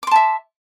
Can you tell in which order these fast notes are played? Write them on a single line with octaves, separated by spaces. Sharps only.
D6 C6 A5 E5